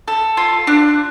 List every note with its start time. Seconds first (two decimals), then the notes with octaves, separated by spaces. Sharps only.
0.08 A4
0.37 F4
0.67 D4